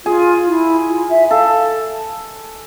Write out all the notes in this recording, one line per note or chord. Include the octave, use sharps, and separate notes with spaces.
F4 G#4
E4
F4
E5
A4 F5